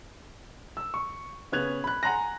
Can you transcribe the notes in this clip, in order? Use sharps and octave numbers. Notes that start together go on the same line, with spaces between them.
E6
C#6
C#3 B3 C#4 F#6 G#6 F7
B5 F#6
F#5 G#5 A#5 C6 F#6 A#6